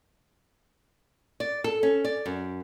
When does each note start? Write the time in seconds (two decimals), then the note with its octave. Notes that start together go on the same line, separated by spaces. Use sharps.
1.40 D5
1.64 A4
1.83 C#4
2.05 D5
2.26 F#2